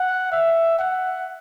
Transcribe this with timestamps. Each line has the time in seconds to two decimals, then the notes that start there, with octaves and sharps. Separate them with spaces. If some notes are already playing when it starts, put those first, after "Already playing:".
Already playing: F#5
0.32 E5
0.79 F#5